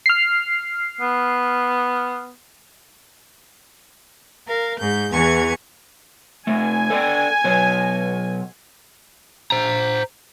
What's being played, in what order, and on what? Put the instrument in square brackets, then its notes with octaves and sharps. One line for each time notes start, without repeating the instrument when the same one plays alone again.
[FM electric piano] F6 C7
[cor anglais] B3
[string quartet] A#4 F5
G#2 G6
E2 E3 G#5 C#6 G#6
[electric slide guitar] C3 A3 [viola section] G#5
[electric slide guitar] A4 D5 G5
B2 F#3 C#5
[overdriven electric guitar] C5 A#5